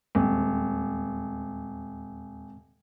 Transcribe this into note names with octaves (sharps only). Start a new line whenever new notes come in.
D#1 E2 G#3 C4